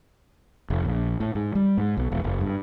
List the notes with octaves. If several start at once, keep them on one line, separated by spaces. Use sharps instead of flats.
F1
A#1
A2
G#2
G3
G#2
B1
E1
F#1
G2